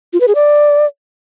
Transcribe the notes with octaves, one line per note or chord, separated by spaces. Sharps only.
F4
B4
G#4
D5